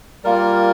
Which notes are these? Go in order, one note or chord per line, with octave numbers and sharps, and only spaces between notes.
G3 A#3 F4 A#4